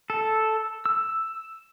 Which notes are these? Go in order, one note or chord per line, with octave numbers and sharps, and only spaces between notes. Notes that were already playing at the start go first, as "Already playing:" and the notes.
A4
E6